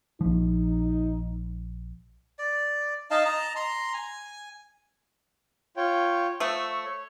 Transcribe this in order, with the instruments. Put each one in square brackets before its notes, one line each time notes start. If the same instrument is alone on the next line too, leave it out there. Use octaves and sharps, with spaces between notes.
[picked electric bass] A#1 F3 [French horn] D#4
[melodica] D5
D#4 D#5 F5 A5
D#5 A5 A#5
A#5 C6
G#5
[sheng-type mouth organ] F4 C#5 G5
[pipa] F3 A3 [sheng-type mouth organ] C#6 E6
[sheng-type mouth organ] C#5